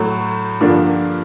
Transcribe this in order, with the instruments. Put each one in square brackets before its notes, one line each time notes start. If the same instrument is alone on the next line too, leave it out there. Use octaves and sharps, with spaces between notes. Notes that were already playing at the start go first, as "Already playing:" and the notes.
Already playing: [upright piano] A2 F#3 A3
G2 D3 F3 A#3 D4